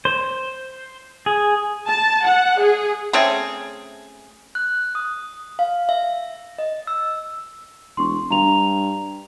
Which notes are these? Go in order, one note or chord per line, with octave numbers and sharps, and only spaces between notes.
C5
G#4
A5
F#5
G#4
A3 C4 C#4 G#4
F#6
D#6
F5
E5
D#5
E6
E1 C6 C#6
G2 A#5 F7